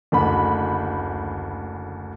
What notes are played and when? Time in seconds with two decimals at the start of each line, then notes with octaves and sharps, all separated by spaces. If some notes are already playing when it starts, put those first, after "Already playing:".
0.12 F#1 D2 B5